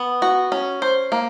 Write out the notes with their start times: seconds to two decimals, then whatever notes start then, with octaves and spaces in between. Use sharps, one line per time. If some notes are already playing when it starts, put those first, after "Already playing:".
Already playing: B3
0.22 F#4
0.52 C#4
0.82 C5
1.12 A#3